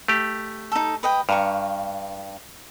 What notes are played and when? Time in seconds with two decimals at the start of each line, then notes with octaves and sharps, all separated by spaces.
0.08 A3 G4
0.72 D#4 A4
1.03 B4 D#5 G5
1.29 G2 F5 A#5 C#6